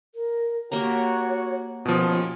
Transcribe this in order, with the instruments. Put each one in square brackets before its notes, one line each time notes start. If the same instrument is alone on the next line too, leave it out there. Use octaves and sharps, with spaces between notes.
[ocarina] A#4
[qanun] A#3 G4 A#5 [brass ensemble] F#4 F#5 [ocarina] C#5
[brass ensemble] D#2 C#4 [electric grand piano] B2 F3 [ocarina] F4